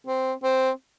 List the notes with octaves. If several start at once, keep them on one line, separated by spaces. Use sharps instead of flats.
C4
C4